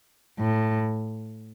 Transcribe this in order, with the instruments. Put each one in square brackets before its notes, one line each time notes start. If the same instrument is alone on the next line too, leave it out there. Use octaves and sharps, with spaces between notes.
[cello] A2